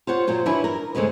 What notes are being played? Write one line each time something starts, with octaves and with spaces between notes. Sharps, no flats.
F4 C5 C#5 F#5
A#2 F#3 F4 C5
E3 F#3 C#4 D4 E4
A#4
D#2 G#2 C#3 G#3 A3